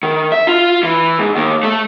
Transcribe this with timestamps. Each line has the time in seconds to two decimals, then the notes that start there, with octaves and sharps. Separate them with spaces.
0.03 D#3
0.32 E5
0.47 F4
0.83 E3
1.19 G#2
1.36 D#2
1.63 A3